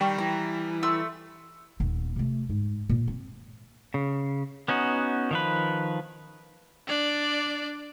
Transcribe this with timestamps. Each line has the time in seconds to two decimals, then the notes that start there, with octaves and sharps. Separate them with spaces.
0.01 D#3 G3 G5 C#6
0.18 E3 A#5
0.83 A3 E4 C6 E6
1.80 D#1 B3
2.16 C3 A3
2.49 G#2
2.89 A#2
3.08 C4
3.94 C#3
4.68 B3 C#4 D#4 F#4
5.31 D#3 F3 B4
6.87 D4 D5